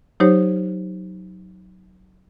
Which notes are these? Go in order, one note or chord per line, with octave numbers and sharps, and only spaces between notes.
F#3 D#4 G4 C5 C#5